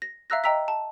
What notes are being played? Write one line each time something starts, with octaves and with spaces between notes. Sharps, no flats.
A#6
E5 F5 A#5 E6 F#6 A#6
D#5 G5 A#5 E6 B6
A5